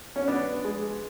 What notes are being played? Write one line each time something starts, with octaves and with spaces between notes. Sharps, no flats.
C#4
B3 D4
G#3